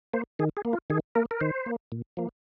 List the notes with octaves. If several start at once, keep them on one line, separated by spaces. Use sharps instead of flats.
A#3 C5
D#3 G#4
G#4
A#3
F4
D#3 G#4
A#3 A#4
A#4
D#3 C5
A#3
A#2
F3 A#3